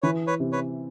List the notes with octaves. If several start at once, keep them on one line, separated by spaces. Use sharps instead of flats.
E3 B4 C#5
B4 C#5
C3
B4 C#5